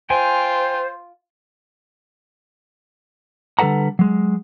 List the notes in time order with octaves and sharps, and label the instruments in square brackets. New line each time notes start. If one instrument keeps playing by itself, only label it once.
[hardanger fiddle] F4 [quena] C5 [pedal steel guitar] G5 G#5 C6
[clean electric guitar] D3 G3 A4 B4 F#5 A#5
F#3 G#3